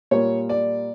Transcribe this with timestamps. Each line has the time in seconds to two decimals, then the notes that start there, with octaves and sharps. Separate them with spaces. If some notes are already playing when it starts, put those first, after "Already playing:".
0.11 A#2 G3 A#3 C#5
0.49 D5